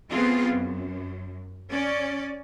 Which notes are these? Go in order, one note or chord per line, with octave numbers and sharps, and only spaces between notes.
A3 B3 C4 F4 G#4
F#2
C#4 D5